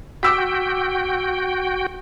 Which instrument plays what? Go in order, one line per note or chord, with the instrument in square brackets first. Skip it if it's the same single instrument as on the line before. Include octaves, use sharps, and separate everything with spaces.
[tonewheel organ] F#4 G5 [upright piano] D6 E6 B6